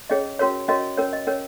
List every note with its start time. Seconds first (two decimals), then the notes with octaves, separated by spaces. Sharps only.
0.10 C#4 G#4 C#5 D#5
0.39 C#4 F#4 A#4 C#5
0.68 C#4 F#4 A#4 C#5 D#5
0.97 C#4 A#4 C#5
1.13 D#5
1.27 C#4 A#4 C#5